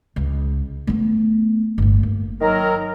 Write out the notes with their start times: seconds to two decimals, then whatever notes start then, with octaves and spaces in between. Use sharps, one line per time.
0.16 C#2
0.87 A3 B3
1.78 G1 A2
2.03 A#3
2.41 D#3 F#3 A#4